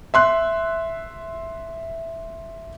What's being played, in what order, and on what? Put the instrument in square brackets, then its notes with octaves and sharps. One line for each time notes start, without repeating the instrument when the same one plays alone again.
[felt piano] E5 C6 F#6